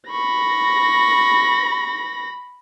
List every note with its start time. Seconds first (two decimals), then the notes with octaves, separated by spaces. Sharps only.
0.10 B5 C#6 A#6